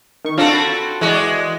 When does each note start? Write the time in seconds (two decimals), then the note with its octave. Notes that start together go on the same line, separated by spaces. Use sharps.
0.25 D#3 C#6
0.38 C4 D4 F4 F#4 A4
0.53 A5 B5
1.01 E3 G#3 F#4 D5